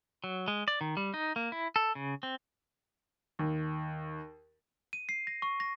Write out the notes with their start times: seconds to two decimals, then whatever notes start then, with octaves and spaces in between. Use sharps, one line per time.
0.24 F#3
0.48 G#3
0.68 D5
0.81 D#3
0.97 G3
1.14 D#4
1.36 A#3
1.52 E4
1.76 A4
1.95 C#3
2.23 C4
3.39 D#2
4.93 D#7
5.09 C7
5.27 A#6
5.42 C#6
5.60 A#6